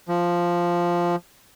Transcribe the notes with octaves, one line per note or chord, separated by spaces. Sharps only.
F3